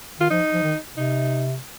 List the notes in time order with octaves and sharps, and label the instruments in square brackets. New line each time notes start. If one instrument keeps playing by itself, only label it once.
[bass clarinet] D#3 [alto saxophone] F4
[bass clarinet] F3 [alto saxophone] D#4
[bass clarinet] F3
D#3
[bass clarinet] C3 [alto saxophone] D#4